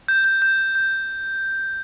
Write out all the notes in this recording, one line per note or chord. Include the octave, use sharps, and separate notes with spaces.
G6
G6
G6
G6
G6